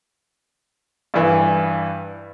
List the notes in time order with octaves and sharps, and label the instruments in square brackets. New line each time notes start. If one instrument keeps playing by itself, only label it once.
[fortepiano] G2 E3